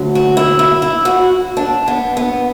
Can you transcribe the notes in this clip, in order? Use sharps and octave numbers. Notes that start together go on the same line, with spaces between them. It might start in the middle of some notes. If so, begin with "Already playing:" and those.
Already playing: D2 D3 F#3
F#4
E4
E4
E4
F#4
D4
B3
B3